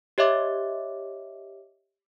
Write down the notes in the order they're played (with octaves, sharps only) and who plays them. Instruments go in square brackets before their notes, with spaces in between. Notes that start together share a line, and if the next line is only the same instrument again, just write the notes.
[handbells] G4 C#5 D#5 E5 D6